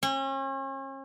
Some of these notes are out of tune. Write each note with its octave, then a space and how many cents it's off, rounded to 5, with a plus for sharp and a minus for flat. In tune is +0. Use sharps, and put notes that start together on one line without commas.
C#4 -40